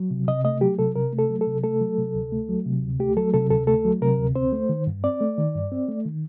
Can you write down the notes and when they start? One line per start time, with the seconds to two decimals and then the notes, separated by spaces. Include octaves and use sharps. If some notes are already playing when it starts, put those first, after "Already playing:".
Already playing: F#3
0.11 C3
0.28 C3 D#5
0.45 A3 D#5
0.61 F#3 G4
0.79 C3 A4
0.95 C3 A#4
1.13 A3
1.19 A4
1.30 F#3
1.41 A4
1.47 C3
1.64 A3 A4
1.81 F#3
1.98 C3
2.15 D2
2.32 A3
2.49 F#3
2.66 C3
2.83 D2
3.00 A3 G4
3.17 F#3 A4
3.34 C3 A4
3.50 D2 A4
3.67 A3 A4
3.85 F#3
4.02 C3 A#4
4.19 D2
4.35 C4 C5
4.53 A3
4.69 D#3
4.87 G2
5.04 C4 D5
5.21 A3
5.38 D#3
5.55 G2
5.72 C4
5.89 A3
6.05 D#3